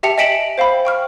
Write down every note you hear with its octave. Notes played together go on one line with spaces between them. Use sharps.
G4 E5 G5 A5 C#7 F7
D#5 G#5 B6 D7 E7 F#7
C5 F5 G5 B5
G5 C#6 F6